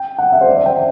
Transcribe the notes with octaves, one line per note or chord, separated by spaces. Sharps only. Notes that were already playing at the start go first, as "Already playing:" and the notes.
Already playing: G5
F#5
E5
C5
D5
E5
G5